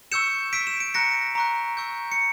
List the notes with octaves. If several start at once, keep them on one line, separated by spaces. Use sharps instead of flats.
C#6 E6 G6 C#7 E7
C#6 E6 G6 B6 D7
E7
D7
A#5 C#6 F#6 A#6 C#7
A#5 C#6 F#6
C#6 E6 G6
C#7